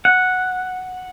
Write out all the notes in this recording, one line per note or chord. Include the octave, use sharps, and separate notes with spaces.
F#5